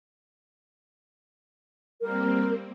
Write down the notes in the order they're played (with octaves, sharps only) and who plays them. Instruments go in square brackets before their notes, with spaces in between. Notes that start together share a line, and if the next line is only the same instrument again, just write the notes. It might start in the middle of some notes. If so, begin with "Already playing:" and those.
[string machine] G3 A#3 C4 [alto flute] A#4